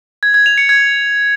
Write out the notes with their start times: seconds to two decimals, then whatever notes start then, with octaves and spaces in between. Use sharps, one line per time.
0.23 G#6
0.34 G#6
0.46 F7
0.58 C#7
0.69 G#6